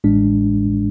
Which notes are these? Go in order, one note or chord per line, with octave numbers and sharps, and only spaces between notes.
A1 A2 G#3 D4